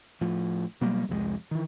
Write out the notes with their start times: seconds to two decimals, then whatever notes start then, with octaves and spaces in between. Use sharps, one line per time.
0.21 A2 F3
0.81 B2 F#3 G3 A#3
1.09 C2 F2 F#3 G#3
1.51 D#3 E3